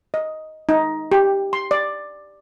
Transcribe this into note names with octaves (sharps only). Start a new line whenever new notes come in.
D#5
D#4
G4
C6
D5